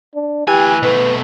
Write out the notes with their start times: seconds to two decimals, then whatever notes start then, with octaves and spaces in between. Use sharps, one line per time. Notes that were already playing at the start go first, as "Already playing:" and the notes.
0.15 D4
0.48 D2 E3 G4 G#5
0.83 B2 A3 B4